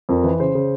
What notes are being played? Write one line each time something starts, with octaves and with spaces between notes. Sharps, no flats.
F2 A#4
E3 B4
C#3 C5
C#3